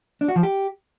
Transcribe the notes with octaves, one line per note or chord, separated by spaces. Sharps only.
D4
F#4
F3
G4